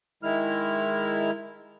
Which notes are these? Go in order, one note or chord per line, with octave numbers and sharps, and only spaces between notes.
D#3 G#3 E4 F6